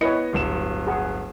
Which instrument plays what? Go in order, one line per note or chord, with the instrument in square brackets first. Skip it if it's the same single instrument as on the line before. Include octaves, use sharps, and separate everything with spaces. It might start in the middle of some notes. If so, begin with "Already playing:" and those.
[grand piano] B3 D#5 C#7 [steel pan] E4 B4 C#5
[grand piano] D1 G1 E7
[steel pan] G#4 F#5